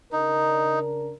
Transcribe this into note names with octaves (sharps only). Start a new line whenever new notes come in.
C#3 D4 D#4 A#4